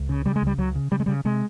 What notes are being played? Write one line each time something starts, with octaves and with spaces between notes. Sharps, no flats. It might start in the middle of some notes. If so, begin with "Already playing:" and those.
Already playing: C#2
C#3
C#3 G3
G#3
C#2 G3
C#2 F#3
C#3
C#3 G3
G#3
C#3 G3
C3 G#3